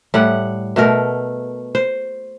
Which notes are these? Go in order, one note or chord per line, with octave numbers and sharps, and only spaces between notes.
A2 G3 F#5
B2 A3 A#4
C5